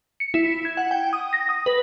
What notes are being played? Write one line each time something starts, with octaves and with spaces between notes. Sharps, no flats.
C#7
E4
G#6
F#5
G5
D#6
A#6
D#6
B4